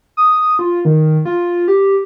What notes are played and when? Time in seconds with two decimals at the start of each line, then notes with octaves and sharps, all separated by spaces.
0.17 D#6
0.59 F4
0.85 D#3
1.25 F4
1.68 G4